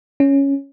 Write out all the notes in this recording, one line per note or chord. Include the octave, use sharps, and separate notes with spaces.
C#4